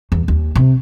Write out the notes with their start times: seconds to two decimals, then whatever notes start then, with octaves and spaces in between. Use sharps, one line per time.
0.12 E2
0.28 D#2
0.56 C3